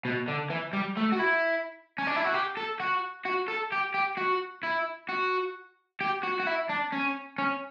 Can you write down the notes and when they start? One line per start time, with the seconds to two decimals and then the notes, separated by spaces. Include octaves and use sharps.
0.05 B2
0.28 D3
0.50 E3
0.73 G3
0.97 A3
1.12 F#4
1.19 E4
1.98 C#4
2.07 D4
2.16 E4
2.25 F#4
2.34 G4
2.57 A4
2.80 F#4
3.25 F#4
3.48 A4
3.72 G4
3.94 G4
4.17 F#4
4.63 E4
5.09 F#4
6.01 G4
6.23 F#4
6.39 F#4
6.47 E4
6.69 D4
6.92 C#4
7.38 C#4